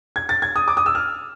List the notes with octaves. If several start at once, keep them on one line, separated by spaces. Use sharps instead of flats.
G#6
A6
G#6
D#6
D6
D#6
E6
F6